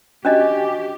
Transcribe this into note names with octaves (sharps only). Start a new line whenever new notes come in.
C#4 D4 F#4 G4 D#5